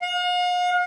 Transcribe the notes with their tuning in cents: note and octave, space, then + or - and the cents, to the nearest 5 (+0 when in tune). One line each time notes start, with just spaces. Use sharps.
F5 +45